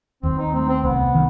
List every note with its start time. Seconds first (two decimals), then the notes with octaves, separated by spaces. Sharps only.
0.23 D#2 C4
0.39 D#4
0.54 A3 C4
0.69 C4
0.84 C2 B3
1.14 D#3